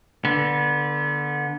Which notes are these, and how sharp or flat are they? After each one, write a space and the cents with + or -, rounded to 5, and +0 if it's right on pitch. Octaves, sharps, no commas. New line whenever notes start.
D3 +0 B3 -25